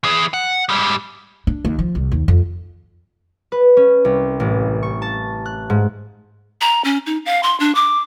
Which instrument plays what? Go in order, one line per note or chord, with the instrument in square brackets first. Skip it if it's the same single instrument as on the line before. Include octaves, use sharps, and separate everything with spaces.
[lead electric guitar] E3 G#4
F#5
G#2 G3
[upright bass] D4
D#2
F3
C2
D#2
F2
[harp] B4
C#4
C2
A1
C#6
A5
F#6
G#2
[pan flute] A#5
C#4
D#4
F5
C6
D4
D6